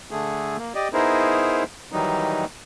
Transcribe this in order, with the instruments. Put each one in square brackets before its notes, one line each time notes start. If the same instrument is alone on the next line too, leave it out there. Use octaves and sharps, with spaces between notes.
[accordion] D3 A3 G#4
A#3
G4 D5 D#5
B3 D#4 E4 G#4 A#4 C5
D#3 E3 F#3 G3 D#4